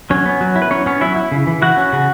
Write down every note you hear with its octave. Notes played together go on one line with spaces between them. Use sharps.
F#3 C#4 C#5
B3
F#3
E4
B4
F#3 C#4 C#5
B3 C#4 C#5
F#3 E4 E5
E4
C#3
E3
E4 F#4 F#5
C#4
C#3